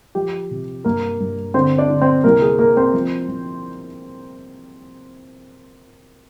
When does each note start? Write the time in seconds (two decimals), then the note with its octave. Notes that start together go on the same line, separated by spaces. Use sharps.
0.15 F3 G4
0.51 C3
0.84 G2 A#3 A#4
1.20 G2
1.54 D3 C4 C5
1.78 D4 D5
1.89 D3
2.01 C4 C5
2.24 C2 A#3 A#4
2.42 G#4
2.59 A#3 A#4
2.77 C4 C5
2.93 F3
3.28 F3